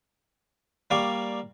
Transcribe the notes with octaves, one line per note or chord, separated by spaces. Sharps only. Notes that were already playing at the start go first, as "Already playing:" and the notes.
G3 A#3 D5 F5 C#6